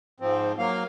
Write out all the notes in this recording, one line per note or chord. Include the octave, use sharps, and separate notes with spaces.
G#2 F3 C4
F#3 A#3 F5